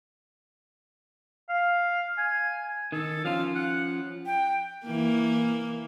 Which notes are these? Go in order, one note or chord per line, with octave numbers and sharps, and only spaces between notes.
F5
G#5
D#3 A4
F3 C#4 F4 F5
F#5
G5
E3 A#3